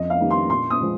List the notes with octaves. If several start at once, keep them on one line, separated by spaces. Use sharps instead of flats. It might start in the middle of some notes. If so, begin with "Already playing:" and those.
Already playing: F2 D#5
F5
D#3 G3 A#3
C6
A#2 C6
D#6
F3 G#3